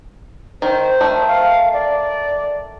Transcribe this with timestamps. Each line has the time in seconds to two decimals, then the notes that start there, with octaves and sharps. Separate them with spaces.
0.62 D#3 C5
1.01 D#3 A3
1.27 F5
1.73 D5